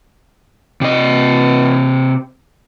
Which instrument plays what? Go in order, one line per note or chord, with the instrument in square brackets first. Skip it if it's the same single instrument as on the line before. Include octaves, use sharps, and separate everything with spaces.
[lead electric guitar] C3 D#5